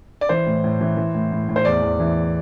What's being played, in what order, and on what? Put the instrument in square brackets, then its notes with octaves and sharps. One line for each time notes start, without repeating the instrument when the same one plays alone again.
[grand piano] D5
E3 C5
A2
A2
E3
E3
A2
A2
A2
C5
E2 D5
E2
E3